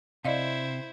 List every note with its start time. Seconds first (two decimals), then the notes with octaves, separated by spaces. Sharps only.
0.25 C3 E4 C5 D5 D#5 F5